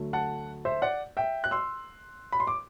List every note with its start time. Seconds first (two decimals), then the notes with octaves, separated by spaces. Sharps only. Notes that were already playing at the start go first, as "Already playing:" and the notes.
Already playing: D2 D3 F#3 A3
0.13 F#5 A5
0.65 C5 E5
0.82 D5 F#5
1.17 E5 G5
1.44 F#6
1.51 C6 E6
2.32 B5
2.40 C6
2.47 D6